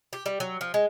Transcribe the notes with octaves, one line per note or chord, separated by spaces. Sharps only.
G4
G3
F#3
F3
G#3